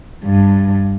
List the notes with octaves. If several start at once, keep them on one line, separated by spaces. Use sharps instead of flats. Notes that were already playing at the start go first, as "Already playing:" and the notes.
G2